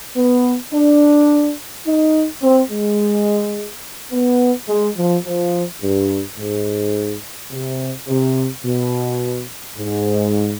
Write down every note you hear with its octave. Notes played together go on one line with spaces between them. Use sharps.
B3
D4
D#4
C4
G#3
B3
G#3
F3
F3
G2
G#2
C3
C3
B2
G#2